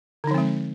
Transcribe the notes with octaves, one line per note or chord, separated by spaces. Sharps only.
D3 F3 G#3 C4 D#4